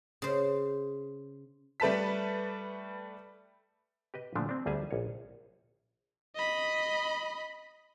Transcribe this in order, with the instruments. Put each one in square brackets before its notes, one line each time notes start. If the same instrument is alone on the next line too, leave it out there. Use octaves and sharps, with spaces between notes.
[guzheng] C#3 C5
[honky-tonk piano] G3 A3 B4 A5 B6
[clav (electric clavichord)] G4 B4 D#5
A#2 D3 F3 A3 D4
C4 D4
D2 G3 G#4 E5 A5
A#1 A#4 C#5
[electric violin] D#5 B5